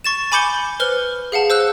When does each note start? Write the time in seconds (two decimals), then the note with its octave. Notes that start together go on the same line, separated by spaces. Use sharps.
0.04 C#6 A6 E7
0.32 G#5 B5 D6 G6 C#7 G7
0.80 B4 C5 F6 G7
1.32 G#4 F5 F#5 A5
1.50 C5 E6 F#6